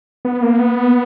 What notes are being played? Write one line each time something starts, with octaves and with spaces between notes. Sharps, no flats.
B3
A#3
B3